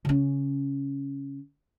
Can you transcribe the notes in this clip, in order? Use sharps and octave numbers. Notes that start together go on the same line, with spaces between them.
C#3 C#4